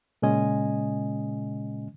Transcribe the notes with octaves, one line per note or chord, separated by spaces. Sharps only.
A#2 C#3 G#3 C#4 D#5 G#5